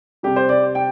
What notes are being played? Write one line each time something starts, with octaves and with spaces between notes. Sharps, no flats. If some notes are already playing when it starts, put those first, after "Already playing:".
C3 G3 G4
C5
D5
G5